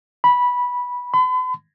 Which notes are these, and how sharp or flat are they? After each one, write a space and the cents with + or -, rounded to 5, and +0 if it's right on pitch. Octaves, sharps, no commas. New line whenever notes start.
B5 -10
B5 +45